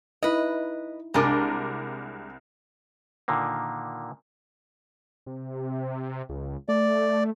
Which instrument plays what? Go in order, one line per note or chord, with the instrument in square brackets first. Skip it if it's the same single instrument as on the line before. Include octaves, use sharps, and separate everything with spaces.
[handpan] D#4 E4 [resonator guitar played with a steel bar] B4 D#5
[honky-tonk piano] C2 A#4 D6 [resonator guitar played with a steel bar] G#3 D4
[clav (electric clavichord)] A#2 D3 D#3 A#3
[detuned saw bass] C3
C#2
[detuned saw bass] A3 [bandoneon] D5